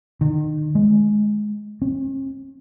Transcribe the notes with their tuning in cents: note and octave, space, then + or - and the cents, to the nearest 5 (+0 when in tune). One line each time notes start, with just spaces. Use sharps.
D#3 -30
G#3 +15
C#4 -45